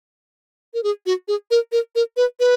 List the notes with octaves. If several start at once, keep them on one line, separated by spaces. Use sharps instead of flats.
A#4
G#4
F#4
G#4
A#4
A#4
A#4
B4
B4